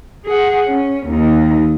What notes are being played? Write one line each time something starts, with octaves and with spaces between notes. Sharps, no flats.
G#4 F#5
C#4
D#2 D#4